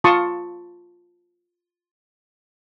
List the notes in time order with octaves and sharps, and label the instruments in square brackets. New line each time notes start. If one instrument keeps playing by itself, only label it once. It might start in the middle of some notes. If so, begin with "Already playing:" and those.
[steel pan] F4 A5 C6 C#6 D#6